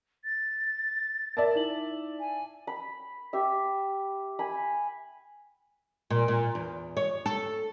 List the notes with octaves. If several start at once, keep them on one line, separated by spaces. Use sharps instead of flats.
A6
A#4 D5 E5 A5
D#4 E4 F#7
G#5
B5
G4 E5
G#5 B5
A#2
A#2
E2
C#5
A4